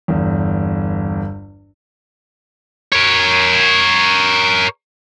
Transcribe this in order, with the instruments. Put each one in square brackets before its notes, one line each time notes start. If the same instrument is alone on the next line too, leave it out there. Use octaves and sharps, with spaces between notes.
[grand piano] G1 E2
[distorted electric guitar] A#4 C#5